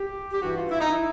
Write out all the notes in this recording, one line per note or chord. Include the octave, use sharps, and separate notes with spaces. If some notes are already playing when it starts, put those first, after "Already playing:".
Already playing: G4
G4
G2 E3 F#4
F4
E4
D#4
E4